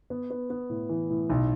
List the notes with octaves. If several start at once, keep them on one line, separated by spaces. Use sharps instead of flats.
B3
B3
B3
A2
E3
A2
B1